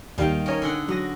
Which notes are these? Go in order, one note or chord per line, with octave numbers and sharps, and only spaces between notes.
D#2 D#3 G3 F5 G5
C#4 A#4 C#5 D#5
D3 G#4 F#5
F#3 F#4 D#6 A#6